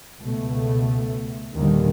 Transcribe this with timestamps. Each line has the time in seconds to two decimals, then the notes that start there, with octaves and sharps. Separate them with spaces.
0.20 C#2 B2 A3
1.54 A#1 D#2 A#2 D3 D#3 G3